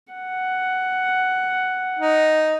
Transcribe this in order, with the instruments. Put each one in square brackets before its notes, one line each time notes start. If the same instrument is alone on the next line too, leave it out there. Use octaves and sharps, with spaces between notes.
[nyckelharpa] F#5
[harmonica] D#4